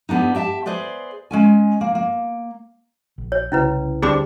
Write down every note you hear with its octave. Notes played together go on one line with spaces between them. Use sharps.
G3 B3 D4 D#4
G4 E5 G5 A5
G#4 B4 C5 D5
G#3 C#4 G#5
A#3
A#3
A#1
C#5
C2 C#3 C#4 E4 B4
D2 G3 C4 D4 G#4 B5 D6